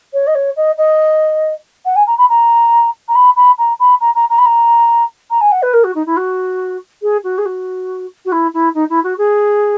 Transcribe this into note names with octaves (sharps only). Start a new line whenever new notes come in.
C#5
D#5
C#5
D#5
D#5
F#5
G#5
A#5
B5
A#5
A#5
B5
B5
A#5
B5
A#5
A#5
A#5
B5
A#5
A#5
G#5
F#5
B4
A#4
F#4
D#4
E4
F#4
G#4
F#4
G#4
F#4
F#4
E4
E4
D#4
E4
F#4
G#4